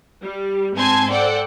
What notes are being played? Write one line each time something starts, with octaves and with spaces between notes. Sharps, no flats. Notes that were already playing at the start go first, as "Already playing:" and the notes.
G3
G#2 C4 G#5 A5 C6 G#6
A4 C5 D5 F#5 G5